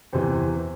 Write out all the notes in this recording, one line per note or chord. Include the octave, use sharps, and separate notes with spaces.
E2 C3 E3 C5